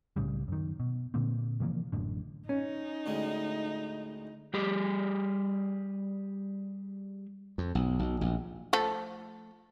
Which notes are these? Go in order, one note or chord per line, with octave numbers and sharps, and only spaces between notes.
C2 A2 C#3 G3
F#2 D#3
B2
A#2 D3 A#3 C4
C3 E3 F3 A#3
A1 F#2 A2 D3
C#4 D#4
D2 A2 G#3
G3 G4 G#4
F2
B1
B1
A#1
F3 A3 A4